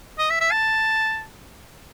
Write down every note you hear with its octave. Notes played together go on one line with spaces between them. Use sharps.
D#5
E5
E5
A5